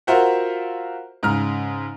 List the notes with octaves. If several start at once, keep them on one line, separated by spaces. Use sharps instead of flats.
F4 F#4 A#4 C5 E5 F#5
G#2 C#3 A#5 F6